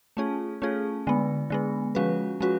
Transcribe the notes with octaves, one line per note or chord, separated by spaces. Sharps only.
A3 C#4 F4 G#4
A3 C#4 F4 G#4
D3 G#3 B3
D3 G#3 B3
F3 G#3 C#4 F#4 B4
F3 G#3 C#4 F#4 B4